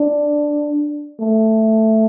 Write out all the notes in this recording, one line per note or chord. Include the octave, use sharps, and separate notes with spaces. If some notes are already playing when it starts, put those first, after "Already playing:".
Already playing: D4
A3